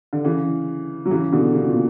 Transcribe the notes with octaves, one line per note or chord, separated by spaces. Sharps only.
D3
C#3 E3
F#3
C#3 E3
B2 D3
C#3
B2
A#2